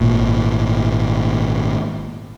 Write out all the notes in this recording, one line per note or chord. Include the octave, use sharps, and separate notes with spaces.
G#1 A#2